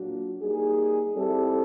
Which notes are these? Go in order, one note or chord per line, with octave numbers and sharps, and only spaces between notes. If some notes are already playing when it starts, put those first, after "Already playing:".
Already playing: A#2 F#3 A#3 D4 F#4
G3 A#3 D#4 G#4
G3 C4 E4 A4